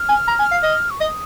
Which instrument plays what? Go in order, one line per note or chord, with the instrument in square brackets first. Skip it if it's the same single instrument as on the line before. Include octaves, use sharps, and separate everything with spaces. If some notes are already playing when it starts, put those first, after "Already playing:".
Already playing: [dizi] F6
[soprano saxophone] G#5
A#5
G#5
F5
D#5
[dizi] C#6
[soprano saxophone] D#5 [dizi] D#6